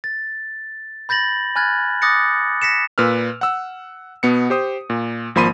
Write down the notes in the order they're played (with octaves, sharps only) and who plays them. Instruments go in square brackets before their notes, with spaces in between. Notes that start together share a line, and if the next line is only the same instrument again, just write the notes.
[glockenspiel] A6
B5 G6 A6 A#6 F#7
G#5 B5 F6 F#6 G#6 A6
D6 D#6 F#6 A6 A#6 C#7
A#6 B6 C#7 E7
[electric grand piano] A#2 B4 E6 F6
F#5 E6
B2 B3 C#7
G4 C5 D#6
A#2
G#1 F3 A#3 B5 C6 D#7